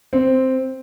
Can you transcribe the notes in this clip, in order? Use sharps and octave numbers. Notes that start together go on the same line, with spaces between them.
C4